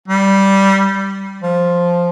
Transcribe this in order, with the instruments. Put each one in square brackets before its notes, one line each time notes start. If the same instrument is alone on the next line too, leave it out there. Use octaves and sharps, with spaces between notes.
[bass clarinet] G3
F3